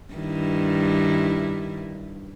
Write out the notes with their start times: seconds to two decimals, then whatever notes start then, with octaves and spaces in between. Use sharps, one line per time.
0.14 G2 D#3 E4